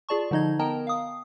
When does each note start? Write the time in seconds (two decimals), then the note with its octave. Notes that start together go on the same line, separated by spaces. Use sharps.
0.09 F4 G#4 D5 A5 C#6
0.31 D3 F3 D#4 D#5 G#6
0.59 B3 A#4 D#5 G5 A5 A#5
0.87 F5 D#6